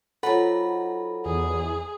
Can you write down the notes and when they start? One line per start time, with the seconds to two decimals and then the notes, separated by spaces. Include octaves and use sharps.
0.23 F3 F#3 D#4 A4 F#5 B5
1.25 E2 G#4